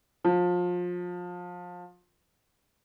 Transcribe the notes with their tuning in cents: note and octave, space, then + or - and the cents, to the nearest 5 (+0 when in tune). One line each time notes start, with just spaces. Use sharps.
F3 +25